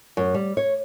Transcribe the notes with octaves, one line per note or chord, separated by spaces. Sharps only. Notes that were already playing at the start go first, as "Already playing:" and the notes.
F#2
G3
C#5